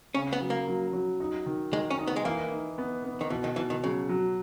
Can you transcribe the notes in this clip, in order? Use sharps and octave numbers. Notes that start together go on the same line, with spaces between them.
C#3 C#4
B3
F#3
A#3
F#3
F#3
D#4
D#3
D#3 G#3
C#4
D#4
B3
G#3
E3 A#3
D#4
B3
B3
D#3
B2 E3
D#3
B2 E3
D#3
C#3 F#3
F#3